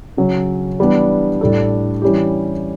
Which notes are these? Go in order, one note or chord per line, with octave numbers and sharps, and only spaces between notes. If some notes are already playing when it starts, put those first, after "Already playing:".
C#3 F#3 C#4
E3 G3 B3 D4
A2 G3 D4 A4
E3 G3 C#4 E4 G4